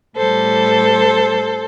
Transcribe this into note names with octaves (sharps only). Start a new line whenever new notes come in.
A2 G3 A4 C5